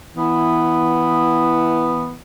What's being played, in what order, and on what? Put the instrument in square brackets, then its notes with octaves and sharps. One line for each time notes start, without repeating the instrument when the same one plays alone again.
[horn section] E3 B3 E4